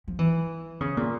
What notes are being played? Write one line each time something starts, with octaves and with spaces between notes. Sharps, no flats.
F3
E3
C#3
A#2